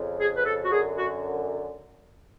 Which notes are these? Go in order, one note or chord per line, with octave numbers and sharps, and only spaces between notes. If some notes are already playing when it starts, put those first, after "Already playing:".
Already playing: F2 C#3
G#4
B4
A4
F#4
F#2 D3 G#4
F#4